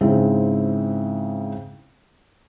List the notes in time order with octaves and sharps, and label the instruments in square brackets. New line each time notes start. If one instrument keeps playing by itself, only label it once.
[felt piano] G#2 C#3 C4 E4